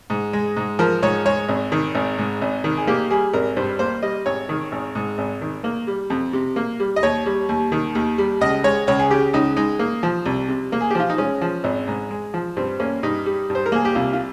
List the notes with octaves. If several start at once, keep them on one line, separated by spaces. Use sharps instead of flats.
G#2
G#3
G#2
F3 A#4
G#2 C#5
G#3 C#5
G#1
D#3
G#1
G#2
G#1
D#3
G#4
A#3 G4
G3 G#4
G#1 A#4
G2 C5
A#3 C5
G3 D#5
G#1 C#5
D#3
G#1
G#2
G#1
D#3
A#3
G3
F2
C3
A#3
G3
D#5
D#2 C#5
G3
D#2
D#3
D#2
G3
C#2 D#5
G#3 C#5
C#2 C#5
G#4
C#3 G4
C#2 D#4
G#3 D#4
A#3
F3
C2
C3
A#3
G#4
G4
F3 F4
D#4
G#3 C#4
F3
G#1
G#2
G#3
F3
G2 C4
A#3 C#4
G2 D#4
G3
G2
C5
A#4
A#3 G#4
G4
C2 F4
F4